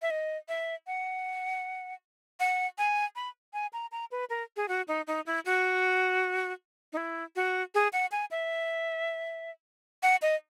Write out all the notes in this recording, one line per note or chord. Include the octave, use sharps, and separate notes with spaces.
E5
D#5
E5
F#5
F#5
G#5
B5
G#5
A#5
A#5
B4
A#4
G#4
F#4
D#4
D#4
E4
F#4
D#4
E4
F#4
G#4
F#5
G#5
E5
F#5
D#5